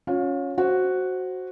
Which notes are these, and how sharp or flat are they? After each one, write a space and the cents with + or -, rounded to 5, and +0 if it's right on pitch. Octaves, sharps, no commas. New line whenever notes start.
C#4 +0 F4 +35
F#4 +0 C5 +10